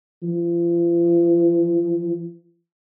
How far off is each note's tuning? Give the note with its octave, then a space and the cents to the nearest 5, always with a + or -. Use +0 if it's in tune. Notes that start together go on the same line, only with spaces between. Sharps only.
F3 -40